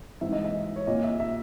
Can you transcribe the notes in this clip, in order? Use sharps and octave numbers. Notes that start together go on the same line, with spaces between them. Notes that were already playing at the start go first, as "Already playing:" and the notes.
G#2 E3 E5
D#5
E5
C#5
A#2 D#5
E5
E5